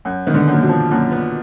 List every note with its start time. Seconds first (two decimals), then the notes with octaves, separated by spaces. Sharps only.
0.05 F#2
0.27 D#3 B3
0.34 D3
0.48 F#2
0.53 A#2
0.62 B2
0.69 F3
0.91 F#2 A#2
1.12 B3